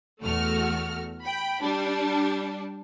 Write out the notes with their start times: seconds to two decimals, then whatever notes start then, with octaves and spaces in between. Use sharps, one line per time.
0.22 E2 A3 F#4 F6
1.24 G5 B5
1.62 G3 D4